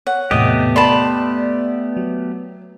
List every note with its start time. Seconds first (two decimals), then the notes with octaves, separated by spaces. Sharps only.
0.07 C#5 F#5
0.31 E2 A2 C3 A3 B3 G4 D#5
0.76 D5 A5 B5 C6
1.97 F#3